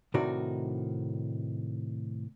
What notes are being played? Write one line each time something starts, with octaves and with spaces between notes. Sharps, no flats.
A2 C3 D#3 D#4 F#4 D5